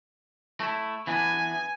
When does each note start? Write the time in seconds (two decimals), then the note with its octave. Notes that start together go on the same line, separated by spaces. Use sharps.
0.60 A3 E4
1.07 E3 B3 D4 G#5